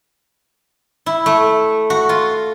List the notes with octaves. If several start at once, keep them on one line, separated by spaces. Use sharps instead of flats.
E4
A3
F#4
F4